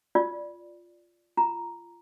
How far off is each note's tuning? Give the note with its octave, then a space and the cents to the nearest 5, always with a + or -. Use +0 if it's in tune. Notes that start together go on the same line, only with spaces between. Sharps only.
F4 +0 D5 +0
F4 -20 A#5 +0